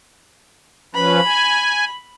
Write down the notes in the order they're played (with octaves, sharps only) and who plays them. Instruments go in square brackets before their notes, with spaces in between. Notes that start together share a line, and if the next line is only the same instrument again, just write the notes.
[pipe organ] F3 C#4 B4 [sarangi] B5
[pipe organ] G#5